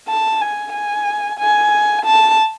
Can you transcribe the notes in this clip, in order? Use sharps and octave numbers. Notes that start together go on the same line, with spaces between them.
A5
G#5
G#5
G#5
A5